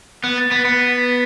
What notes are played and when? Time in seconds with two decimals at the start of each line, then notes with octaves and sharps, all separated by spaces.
0.24 B3 F#6
0.38 A6
0.51 B3 B6
0.65 B3 C#7